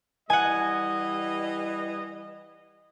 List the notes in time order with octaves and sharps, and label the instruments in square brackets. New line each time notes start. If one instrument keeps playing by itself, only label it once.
[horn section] E3 G3 D#5 [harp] F#5 G#5